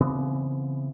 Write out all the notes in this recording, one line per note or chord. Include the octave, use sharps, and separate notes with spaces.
C#3 E3 B3 C4